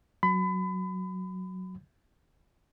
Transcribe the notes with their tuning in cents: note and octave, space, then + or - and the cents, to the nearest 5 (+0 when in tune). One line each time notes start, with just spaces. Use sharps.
F#3 +0 B5 +30